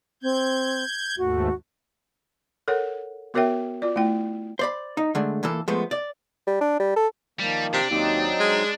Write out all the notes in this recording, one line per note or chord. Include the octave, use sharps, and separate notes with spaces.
C4 G6 G#6
D#2 G#2 A3 F#4
A4 A#4 C#5 F#5
B3 F#4 A#4 C#5 E5 G5
F4 D5
A3 E4 G5
C5 D5 B5
D#4
D3 G#3 A3 D4
A#2 E3 A#3 A4
F3 G#3 A3 B3 C5
D5
G3
D4
G3
A4
D#3 F3 G3 A#3
C3 D4
D#2 F#3 C4 D#4
G#3